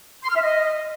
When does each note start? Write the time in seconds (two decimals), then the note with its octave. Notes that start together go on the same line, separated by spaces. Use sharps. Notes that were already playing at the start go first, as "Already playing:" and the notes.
0.24 C6
0.30 F6
0.36 E5
0.43 D#5